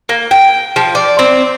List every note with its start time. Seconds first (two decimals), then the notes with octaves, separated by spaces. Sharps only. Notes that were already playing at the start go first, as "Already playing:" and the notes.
0.09 A#3
0.31 G5
0.76 F3
0.95 D5
1.19 C4